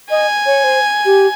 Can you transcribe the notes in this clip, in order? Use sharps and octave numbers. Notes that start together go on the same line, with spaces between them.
D#5 G#5
C#5
C5
G4